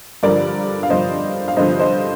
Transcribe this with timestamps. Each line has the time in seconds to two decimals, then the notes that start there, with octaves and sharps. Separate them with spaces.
0.23 G2 D3 F3 A#4 D5
0.83 F5
0.90 G2 D3 F3 C5 D#5
1.48 F5
1.57 G2 D3 F3 C5 D#5
1.79 C5 D#5